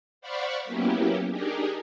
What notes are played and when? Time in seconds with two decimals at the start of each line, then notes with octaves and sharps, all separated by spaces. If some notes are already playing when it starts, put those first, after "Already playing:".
0.21 C5 D5 F5 F#5 B5 C#6
0.65 F#3 A#3 B3 C#4 E4 G4
1.31 D4 D#4 G4 G#4 A#4